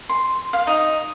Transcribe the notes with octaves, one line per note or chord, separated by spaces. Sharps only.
C6
F5
D#4